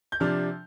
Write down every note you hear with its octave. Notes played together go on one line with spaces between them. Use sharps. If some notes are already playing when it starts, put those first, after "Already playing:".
G6
C3 F3 D4 F6